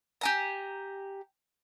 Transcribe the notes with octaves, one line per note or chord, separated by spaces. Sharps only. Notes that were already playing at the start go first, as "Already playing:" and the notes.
G4 G#5 A#5